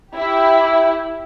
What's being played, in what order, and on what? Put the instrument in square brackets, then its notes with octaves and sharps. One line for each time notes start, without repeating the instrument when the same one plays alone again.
[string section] E4 G4